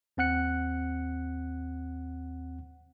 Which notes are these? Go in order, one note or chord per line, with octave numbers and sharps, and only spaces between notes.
D#2 C4 F#5 F#6 C#7